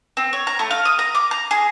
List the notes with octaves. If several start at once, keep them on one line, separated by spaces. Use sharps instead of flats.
C4
C#5
A#5
A3
F5
D#6
A#5
D6
A#5
G#4